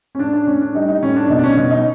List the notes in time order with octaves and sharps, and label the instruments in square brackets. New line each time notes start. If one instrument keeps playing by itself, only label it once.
[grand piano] C#4
A2 D4
D4
A2 C#4
D4
G3 D#4
D#4
A2 C#4
D4
B2 D#4
D4
C#4
B2
D#4